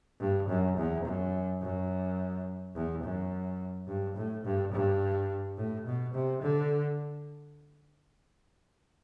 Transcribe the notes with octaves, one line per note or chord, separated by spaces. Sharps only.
G2
F#2
E2
F#2
F#2
E2
F#2
G2
A2
G2
G2
A2
B2
C3
D3